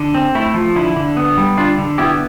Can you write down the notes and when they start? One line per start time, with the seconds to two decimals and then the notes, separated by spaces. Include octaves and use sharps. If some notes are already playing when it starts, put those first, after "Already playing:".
Already playing: D3
0.15 C4
0.35 A3 E4
0.54 F3
0.76 D3 E4
0.96 D3
1.17 B3
1.38 G3
1.57 D3 D4 F4
1.79 D3
1.98 B3 E4 G4